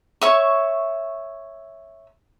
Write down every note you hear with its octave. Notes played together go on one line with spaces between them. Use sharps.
C#5 E5 C#6